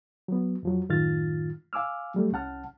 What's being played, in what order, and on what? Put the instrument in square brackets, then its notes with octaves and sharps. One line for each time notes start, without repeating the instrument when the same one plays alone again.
[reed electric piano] F#3 B3
F2 F3 F#3
F#2 A2 D#3 F4 F6 A6
F5 G#5 D6 E6 F6
F#3 G3 A3
C2 C#4 F#5 A5 F6